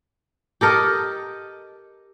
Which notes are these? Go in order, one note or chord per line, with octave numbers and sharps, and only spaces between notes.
G4 A4 A#4 D#5